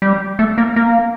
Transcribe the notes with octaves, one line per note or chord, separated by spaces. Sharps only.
G3
A3
A#3
A#3